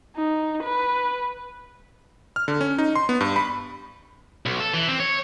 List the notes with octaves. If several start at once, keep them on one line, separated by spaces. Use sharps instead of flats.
D#4
B4
F6
D3
C#4
D#4
C6
B3
G2
B5
B1
A4
E3
C4
C#5